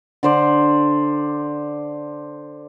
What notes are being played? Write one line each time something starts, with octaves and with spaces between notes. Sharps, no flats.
D3 C5 D5